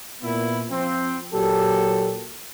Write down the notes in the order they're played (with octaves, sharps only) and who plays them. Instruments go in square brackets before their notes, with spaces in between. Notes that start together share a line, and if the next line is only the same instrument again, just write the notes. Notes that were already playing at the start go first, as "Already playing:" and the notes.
[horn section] A#2 B3 E4
F3 C4
A#2 F#3 G4 A4